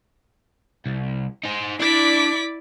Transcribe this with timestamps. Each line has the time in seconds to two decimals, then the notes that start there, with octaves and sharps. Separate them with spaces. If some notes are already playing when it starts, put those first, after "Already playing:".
0.86 C2
1.43 D#4 C5
1.80 D4 E4 D5 D6 B6